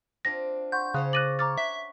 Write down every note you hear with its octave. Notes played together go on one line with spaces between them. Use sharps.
C4 D4 F4 A#6
F#5 C6 C#6 G6
C#3 C#4 C5 C#5 F#6
D6 F#6 A6 A#6 D#7 F#7
C#5 A#5 D6 F6 A6
E5 F#5 B6